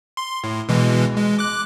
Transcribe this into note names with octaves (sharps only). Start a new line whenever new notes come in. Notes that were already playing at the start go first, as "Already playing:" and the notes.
C6
A2
B2 E3 G#3
G#3
D6 F#6